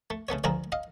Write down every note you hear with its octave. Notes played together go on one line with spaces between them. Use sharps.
A3
C#3 A3 B3 C#5
C#2 D3 F3 F4 G#4 A#5
D#5 F5